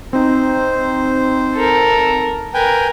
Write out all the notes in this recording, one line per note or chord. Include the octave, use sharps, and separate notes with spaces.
C4 D#4 C5
A4 A#4
A#4 B4 G5 G#5